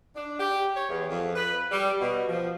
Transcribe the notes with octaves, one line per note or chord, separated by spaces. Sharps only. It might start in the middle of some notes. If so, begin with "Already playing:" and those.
D4
G4
C#5
E2
F2
B4
G3
B2
F3